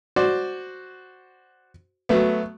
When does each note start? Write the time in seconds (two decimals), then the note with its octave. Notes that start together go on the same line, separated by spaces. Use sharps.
0.16 F#4 C5 D5
2.09 F#3 A3 B3